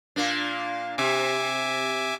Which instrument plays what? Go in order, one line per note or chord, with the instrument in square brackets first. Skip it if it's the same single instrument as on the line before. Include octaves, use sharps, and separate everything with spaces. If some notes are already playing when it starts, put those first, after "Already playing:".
[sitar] A#2 A#3 D4
[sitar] C3 [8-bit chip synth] E5 G#5 D6